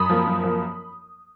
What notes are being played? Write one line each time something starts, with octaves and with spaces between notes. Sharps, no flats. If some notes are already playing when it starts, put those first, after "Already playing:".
Already playing: F#2 B5 D#6
F3 A#3
F#2
F3 A#3